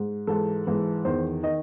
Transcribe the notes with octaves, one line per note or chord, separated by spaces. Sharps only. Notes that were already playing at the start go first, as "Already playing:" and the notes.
Already playing: G#2
G#2 E3 A4
G#2 E3
E2 D#3 C5
D#3 D#5